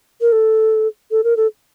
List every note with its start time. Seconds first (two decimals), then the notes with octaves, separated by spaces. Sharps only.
0.21 A#4
0.32 A4
1.11 A4
1.24 A#4
1.37 A4